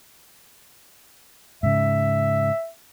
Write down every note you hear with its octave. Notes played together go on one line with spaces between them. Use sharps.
G#2 C#3 E5